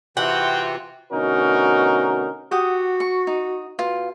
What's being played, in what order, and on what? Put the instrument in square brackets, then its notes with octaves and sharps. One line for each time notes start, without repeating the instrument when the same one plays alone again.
[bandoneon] C3 E3 C4 [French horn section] F4 F#4 [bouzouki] F#5 [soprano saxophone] G5
[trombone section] D2 B2 C#4 D#4 F#4 A#4
[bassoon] F#4 [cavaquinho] G4 F#5 D#6
[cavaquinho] C#6
D#4
[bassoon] B2 [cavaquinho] F4